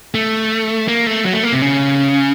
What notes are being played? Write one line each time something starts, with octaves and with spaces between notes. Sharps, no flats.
A3
A#3
A3
F#3
A3
A#3
C3
C#3